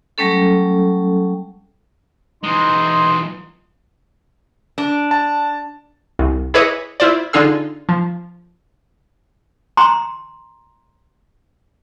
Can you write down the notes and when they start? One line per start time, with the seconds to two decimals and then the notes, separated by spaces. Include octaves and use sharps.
0.18 F#3 G3 A3 C#4 A4
2.43 E3 G#3 D#4 C6
4.78 D4
5.11 A5
6.19 C2
6.54 E4 G#4 B4 C#5 D#5 D6
7.00 E4 F4 C5 D5
7.33 D3 D#4 F4 G#4 E6
7.89 F3
9.77 A#5 C6